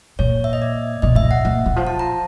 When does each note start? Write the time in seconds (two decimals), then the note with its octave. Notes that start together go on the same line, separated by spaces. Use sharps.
0.19 A#2 C#5
0.44 E5
0.53 D#5
0.62 D5
1.02 B2 D#5
1.15 A2 E5
1.24 A#2
1.31 F#5
1.45 A#2
1.66 E3
1.76 F3
1.87 A5
1.99 A#5